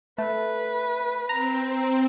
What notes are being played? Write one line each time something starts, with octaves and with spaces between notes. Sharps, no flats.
A3 B4
C4 A#5